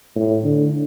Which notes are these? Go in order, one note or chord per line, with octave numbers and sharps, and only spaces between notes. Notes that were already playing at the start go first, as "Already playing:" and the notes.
A2
D3